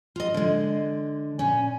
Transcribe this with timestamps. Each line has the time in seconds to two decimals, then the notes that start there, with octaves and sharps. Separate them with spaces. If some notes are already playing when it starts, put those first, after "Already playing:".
0.16 F4 D#5
0.34 D3 G#3
1.39 A#2 C#4 G#5